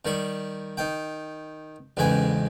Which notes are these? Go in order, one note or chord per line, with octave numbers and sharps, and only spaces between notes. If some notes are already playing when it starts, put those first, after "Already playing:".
D#3 G3 C#6
D#3 G5
A1 E2 G#2 C#3 G5 G#5